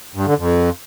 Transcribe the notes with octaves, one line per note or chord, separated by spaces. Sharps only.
G2
D3
F2